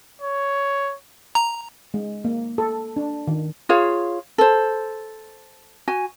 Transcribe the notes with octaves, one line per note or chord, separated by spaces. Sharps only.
C#5
A#5
G#3
A#3
A4
D4
D#3
F4 G#4 C#5 F5
A4 C5
F#4 G#5